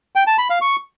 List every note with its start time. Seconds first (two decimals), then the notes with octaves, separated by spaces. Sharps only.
0.16 G5
0.27 A5
0.38 B5
0.50 F5
0.61 C#6